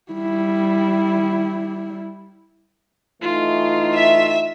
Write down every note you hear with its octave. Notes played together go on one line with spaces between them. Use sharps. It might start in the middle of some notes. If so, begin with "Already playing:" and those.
G3 E4
E3 A3 D#4 F4
E5